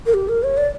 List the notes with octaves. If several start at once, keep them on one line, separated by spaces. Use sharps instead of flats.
A#4
G4
A#4
C#5
D5